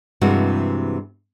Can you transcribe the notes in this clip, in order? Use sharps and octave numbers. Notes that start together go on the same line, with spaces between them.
G2 C3 E3 G#3 A#3 F#4